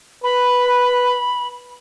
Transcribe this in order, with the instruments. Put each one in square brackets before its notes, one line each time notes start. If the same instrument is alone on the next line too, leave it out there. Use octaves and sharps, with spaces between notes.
[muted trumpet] B4 [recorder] B5